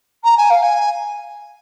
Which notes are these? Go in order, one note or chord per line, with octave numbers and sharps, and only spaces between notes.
A#5
G#5
F5
G#5